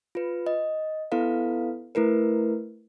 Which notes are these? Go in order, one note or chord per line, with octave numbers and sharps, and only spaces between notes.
F4 B4
D#5
B3 E4 A4 B4 F5
A3 E4 A#4 B4